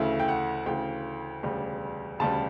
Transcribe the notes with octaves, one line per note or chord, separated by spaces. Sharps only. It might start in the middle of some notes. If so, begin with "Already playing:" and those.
Already playing: D2 C#3 E3 A3 E5
G5
F#5
D2 C#3 E3 A3 G5
E1 D2 C#3 G3
E1 D2 C#3 G3 A5